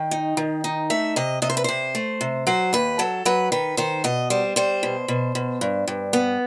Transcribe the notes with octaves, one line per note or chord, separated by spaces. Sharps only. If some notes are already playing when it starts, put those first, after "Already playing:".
Already playing: D#3 G5
D#4
D#3
D#4
A3 E5
C3 D#5
C3 D#5
C5
B4
C3 C5
A3
C3
F#3 C5
D#2 B4
F#3 A4
F#3 B4
D#3 B4
D#3 C5
B2 D#5
G3 C5
G3 C5
B2
B2
B2
G2
G2
B3